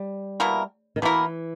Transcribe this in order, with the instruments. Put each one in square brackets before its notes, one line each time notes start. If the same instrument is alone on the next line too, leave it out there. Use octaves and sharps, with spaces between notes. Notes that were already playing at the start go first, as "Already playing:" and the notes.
Already playing: [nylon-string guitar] G3
[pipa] B2 A#3 E4 A#4
[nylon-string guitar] D#3
[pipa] B2 A#3 E4 A#4 [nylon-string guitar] E3